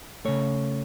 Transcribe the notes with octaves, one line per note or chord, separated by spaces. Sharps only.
C#3 A3 C#5